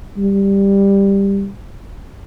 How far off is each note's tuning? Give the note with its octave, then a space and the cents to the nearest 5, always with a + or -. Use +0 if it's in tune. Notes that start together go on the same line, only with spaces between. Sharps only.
G3 +10